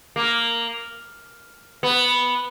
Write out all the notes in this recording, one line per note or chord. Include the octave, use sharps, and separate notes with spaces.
A#3
B3